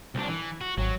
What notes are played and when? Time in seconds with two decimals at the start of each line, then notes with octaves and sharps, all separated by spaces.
0.15 C2 D4
0.29 E3
0.61 F#4
0.78 G#1 F#3